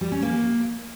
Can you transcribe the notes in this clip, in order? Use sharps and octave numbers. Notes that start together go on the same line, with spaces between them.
G3
C#4
A#3